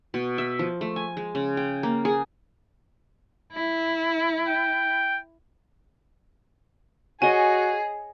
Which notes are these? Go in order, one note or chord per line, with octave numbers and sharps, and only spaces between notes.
B2
E5
F3
A3
G#5
G#3
C#3
G5
A#3
G#4
E4
G5
F#4 G#4 C#5 D#5 G#5